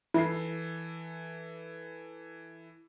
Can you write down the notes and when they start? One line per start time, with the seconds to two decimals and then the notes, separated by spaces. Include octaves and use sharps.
0.14 E3 E4 A4 C7